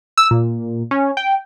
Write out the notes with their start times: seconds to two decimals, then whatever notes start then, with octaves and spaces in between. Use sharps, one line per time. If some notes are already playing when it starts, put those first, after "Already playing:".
0.18 E6
0.31 A#2
0.91 C#4
1.17 G5